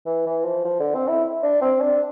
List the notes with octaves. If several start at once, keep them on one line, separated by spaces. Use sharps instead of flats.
E3
E3
F3
F3
D3
C4
E4
D4
C4
D4